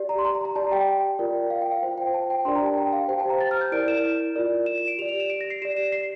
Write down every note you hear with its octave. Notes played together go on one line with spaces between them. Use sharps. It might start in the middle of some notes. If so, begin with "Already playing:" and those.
Already playing: G4 D5
A#5
C6
A#5
A#5
A#5
G4 D5 A5
G5
F4 A#4 D5
F5
G5
F5
F4 C5 G5
G5
A5
G5
D4 G4 A#4 D5 C6
A#5
A5
G5
F5
G4 C5 G5
A5
A#5
A6
F6
G6
E4 A#4 D5 D7
E7
F4 A#4 D5
E7
E7
D7
G4 D5 F7
F7
E7
D7
A#6
C7
G4 D5 E7
E7
C7